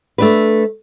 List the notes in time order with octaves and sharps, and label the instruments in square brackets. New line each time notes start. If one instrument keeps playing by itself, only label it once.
[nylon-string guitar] A3 D4 B4